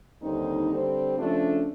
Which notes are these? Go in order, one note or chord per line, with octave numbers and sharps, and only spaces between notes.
D#2 D3 G3 C4 D#4
D3 G3 C4
C#3 F3 A3 D4